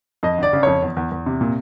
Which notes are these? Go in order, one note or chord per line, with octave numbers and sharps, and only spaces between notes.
F2 D#5
G1 D5
C#3
F2 C#5
E2
E2
E2
C3
A#2